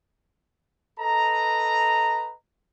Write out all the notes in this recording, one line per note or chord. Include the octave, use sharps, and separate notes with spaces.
A4 B4 D#5 A#5